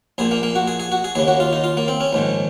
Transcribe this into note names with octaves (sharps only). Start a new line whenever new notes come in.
A#1 A#2 G#4
A#3
A#3
F#4
G#4
G#4
F#4
G#4
D#2 C#3 G#4
F#4
F4
D#4
F4
A#3
C4
C#4
A#1 G#2 D#3